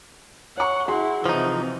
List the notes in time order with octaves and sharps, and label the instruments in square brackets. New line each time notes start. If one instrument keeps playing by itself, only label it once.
[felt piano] C#5 C#6 [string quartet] F#5
[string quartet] E4 [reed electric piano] F#4 G#4 [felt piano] F#5 C6
[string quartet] C3 E3 [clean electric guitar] F3 D#4